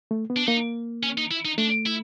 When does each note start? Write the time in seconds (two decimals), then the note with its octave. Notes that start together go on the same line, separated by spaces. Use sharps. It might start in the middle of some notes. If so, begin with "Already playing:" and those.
0.11 A3
0.30 B3
0.36 D4
0.47 A#3 D#4
1.03 C#4
1.18 D#4
1.31 E4
1.45 D#4
1.58 A3 D4
1.86 E4